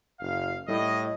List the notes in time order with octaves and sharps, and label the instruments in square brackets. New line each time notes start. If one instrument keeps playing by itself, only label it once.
[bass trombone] F#1 [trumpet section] F5
[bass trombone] A2 [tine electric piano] G3 E4 [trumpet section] D#5